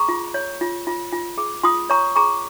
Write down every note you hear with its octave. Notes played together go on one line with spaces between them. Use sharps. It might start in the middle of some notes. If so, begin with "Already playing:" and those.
Already playing: G#4 A#5 C#6
F4
C#5
F4
F4
F4
G#4
F4 C6 D#6
C#5 A#5 C#6
G#4 A#5 C#6